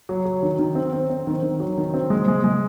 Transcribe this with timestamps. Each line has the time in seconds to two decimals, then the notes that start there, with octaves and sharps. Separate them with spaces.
0.09 F#3
0.25 F#3
0.43 D#3
0.59 D#3
0.75 C4
0.93 C4
1.10 C4
1.27 D#3
1.43 D#3
1.60 F#3
1.78 D#3
1.94 C4
2.10 G#3
2.28 G#3
2.44 G#3